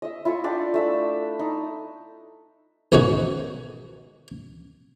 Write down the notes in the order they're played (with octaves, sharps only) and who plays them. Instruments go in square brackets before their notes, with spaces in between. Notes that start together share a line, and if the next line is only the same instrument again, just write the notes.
[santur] D#5 E5
E4 F4 D#5 C#6
D4 D5 G5
A3 E5 B5
D#4
[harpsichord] B1 G#2 D#3 C#4 F#4